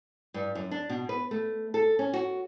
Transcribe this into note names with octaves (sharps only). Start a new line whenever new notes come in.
G2
F#2
D4
B2
B4
A3
A4
C#4
F#4